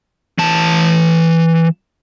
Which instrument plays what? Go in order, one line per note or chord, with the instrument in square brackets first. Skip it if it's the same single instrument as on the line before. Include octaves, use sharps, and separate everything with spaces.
[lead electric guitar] E3 A5